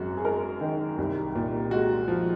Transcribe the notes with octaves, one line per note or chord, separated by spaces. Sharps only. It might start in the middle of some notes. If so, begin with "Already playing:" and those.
Already playing: G#1 F#2 F#4 G#4
G#4
G#3 A#4
D#3
C2
A#2
G#3 F#4
F3